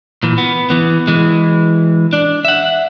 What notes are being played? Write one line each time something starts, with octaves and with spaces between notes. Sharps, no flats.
A#2 E3
B3
E3 B3
E3 G#3
D4 D5
E5 F#5